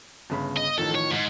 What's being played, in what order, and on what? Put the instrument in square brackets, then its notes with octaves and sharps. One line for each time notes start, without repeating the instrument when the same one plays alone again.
[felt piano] G1 C#3 B5
[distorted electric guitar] D#5
[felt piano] A1 D#3 F3 [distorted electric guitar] A4
[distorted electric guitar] C#5
F2 G#2